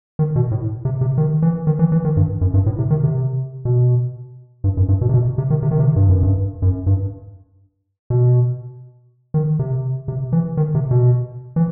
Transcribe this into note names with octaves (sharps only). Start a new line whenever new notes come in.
D#3
B2
A2
C3
C3
D#3
E3
D#3
E3
E3
D#3
G2
F#2
G2
A2
C3
D#3
C3
B2
G2
F#2
G2
B2
C3
B2
C3
D#3
C3
D#3
C3
G2
F#2
G2
F#2
G2
B2
D#3
C3
C3
E3
D#3
C3
B2
E3